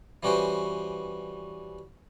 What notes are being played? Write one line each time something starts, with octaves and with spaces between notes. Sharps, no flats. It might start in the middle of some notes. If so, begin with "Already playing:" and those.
E3 G3 C#4 F#4 B4 C5